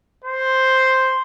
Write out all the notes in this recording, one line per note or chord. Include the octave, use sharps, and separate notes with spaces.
C5